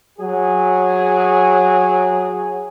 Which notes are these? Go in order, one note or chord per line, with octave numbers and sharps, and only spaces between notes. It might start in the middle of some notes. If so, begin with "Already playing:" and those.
F#3 G#4